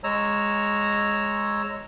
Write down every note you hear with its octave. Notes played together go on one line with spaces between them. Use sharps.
G#3 C#5 A#5 E6